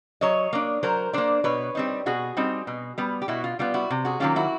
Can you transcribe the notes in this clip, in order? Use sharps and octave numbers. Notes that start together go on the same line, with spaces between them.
F#3 C#5 D#5
A#3 D4
F#3 A#4 C5
A#3 D4 C5 D5
B2 B4 C#5
G3 C4 D#4
B2 F#4 G#4
G3 C4 D#4
B2
G3 B3
G4
B2 E4 F#4
F4
G3 B3 F4
E4 F#4
C3
F#4 G#4
D#3 F#3 A#3 C#4 F4 G4
E4 F#4